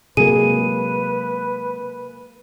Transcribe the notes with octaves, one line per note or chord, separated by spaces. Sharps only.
C3 F#3 G#3 A#3 G#4 B4 D#7